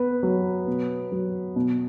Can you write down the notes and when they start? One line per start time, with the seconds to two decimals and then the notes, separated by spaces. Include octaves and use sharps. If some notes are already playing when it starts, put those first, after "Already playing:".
Already playing: B3 B4
0.23 F#3
0.67 B2
1.12 F#3
1.56 B2